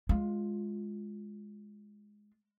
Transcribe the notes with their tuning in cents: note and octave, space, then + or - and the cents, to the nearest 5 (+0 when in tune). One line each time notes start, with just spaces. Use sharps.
G#3 +0 F4 +5